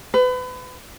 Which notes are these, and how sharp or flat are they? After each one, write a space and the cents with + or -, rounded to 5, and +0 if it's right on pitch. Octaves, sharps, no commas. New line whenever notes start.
B4 +30